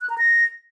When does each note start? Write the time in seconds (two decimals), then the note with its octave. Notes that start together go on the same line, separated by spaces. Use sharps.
0.01 F#6
0.10 A#5
0.18 A#6